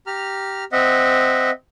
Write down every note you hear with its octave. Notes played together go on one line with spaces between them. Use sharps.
G4 A#5 F6
C4 D#5 E5 F#5